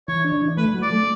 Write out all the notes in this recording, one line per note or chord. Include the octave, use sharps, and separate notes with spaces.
E3 C#5
D4
E3
A3 B4
F#3
D5
A3